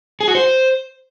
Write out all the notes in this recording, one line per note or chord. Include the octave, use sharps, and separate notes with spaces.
G#4
F#4
C5